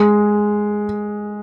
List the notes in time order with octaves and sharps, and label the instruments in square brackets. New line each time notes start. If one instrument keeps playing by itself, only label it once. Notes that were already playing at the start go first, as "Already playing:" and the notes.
Already playing: [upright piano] G#3